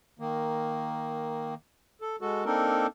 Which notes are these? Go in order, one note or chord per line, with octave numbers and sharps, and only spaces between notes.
D#3 A#3
A4
G#3 F#4 A4
A#3 C4 D4 D#4 A4 A#4